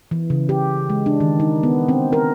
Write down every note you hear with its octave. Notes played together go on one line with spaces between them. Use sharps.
E3
C#3
G4
G#3
D4
D#3
D#4
B3
C4
A#4